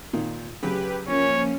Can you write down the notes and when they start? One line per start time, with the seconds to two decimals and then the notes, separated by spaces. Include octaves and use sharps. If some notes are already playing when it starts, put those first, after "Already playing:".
0.13 A#2 D#3
0.62 C#3 F#3 G4 B4
1.08 F3 A#3 C#4 C#5